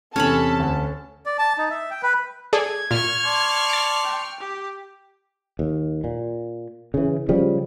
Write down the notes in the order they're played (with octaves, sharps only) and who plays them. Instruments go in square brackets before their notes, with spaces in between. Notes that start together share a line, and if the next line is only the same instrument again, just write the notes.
[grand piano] E2 C3 [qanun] C#4 C#5 B5 [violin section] A4 A5
[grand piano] D2
[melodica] D5
A5
D#4
E5
G5
B4
[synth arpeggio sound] G#4 A4 D5 [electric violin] G#6
[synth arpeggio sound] A#2 [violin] C#6 F6
[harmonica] D5 A5 C6
[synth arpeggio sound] A6 D7
[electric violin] G5
G4
[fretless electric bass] D#2
A#2
C#3 E3
C#3 F3 G3